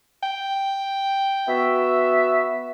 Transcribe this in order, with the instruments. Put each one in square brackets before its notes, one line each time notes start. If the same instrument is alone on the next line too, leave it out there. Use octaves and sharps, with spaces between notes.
[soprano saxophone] G5
[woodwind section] B3 F#4 E5